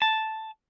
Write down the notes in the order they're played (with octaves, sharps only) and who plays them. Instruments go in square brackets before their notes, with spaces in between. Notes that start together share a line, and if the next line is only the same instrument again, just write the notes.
[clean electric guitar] A5